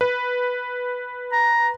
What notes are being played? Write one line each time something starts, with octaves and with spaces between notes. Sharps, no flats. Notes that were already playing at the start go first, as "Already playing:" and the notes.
B4
A#5